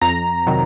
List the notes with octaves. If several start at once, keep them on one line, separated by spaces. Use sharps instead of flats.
F2 A#5
C3 D#3 F#3